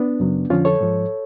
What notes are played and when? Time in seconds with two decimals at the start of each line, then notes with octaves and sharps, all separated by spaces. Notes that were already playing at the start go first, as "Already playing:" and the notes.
Already playing: B3 D4
0.20 F#2 C#3 F#3
0.50 F2 D3 F3 C#4 F4
0.65 A4 C#5
0.81 G#2 F3